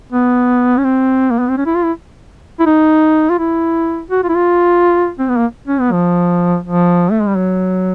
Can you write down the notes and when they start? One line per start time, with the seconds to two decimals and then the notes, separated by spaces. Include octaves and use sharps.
0.12 B3
0.77 C#4
0.84 C4
1.31 A#3
1.39 B3
1.49 C4
1.57 C#4
1.66 E4
1.75 F4
1.84 E4
2.60 E4
2.66 D#4
3.30 F4
3.38 E4
4.10 F#4
4.23 F4
4.29 E4
4.35 F4
5.19 C4
5.28 B3
5.38 A#3
5.67 C#4
5.80 B3
5.92 F3
6.63 F3
7.11 A3
7.20 G#3
7.27 G3
7.36 F#3